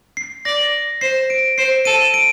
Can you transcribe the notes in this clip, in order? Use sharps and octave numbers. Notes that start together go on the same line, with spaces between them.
C7
D5 A#6
C5 C7
D7
C5 C7
A4 D#7
D7